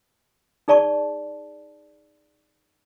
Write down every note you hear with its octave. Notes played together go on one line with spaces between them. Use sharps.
D#4 G#4 D5 A5 C#6